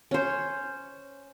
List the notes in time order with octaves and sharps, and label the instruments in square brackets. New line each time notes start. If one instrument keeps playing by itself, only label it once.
[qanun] C#4 C5